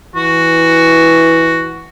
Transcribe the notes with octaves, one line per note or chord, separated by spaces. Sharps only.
E3 F#4